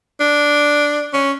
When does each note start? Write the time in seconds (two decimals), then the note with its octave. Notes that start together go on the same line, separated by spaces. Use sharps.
0.20 D4
1.14 C#4